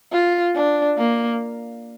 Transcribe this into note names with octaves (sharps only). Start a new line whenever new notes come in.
F4
D4
A#3